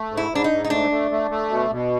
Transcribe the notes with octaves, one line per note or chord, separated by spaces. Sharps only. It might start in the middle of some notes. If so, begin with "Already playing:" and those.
Already playing: A3
G#2
E4
G#2 D4
D#4
G#2
D#4
A3 D4
A3
A3
A3
B2
B2